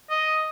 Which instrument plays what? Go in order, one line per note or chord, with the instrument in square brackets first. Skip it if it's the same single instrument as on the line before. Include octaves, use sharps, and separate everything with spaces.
[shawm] D#5